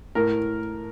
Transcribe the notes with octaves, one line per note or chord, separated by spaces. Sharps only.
A2 A#4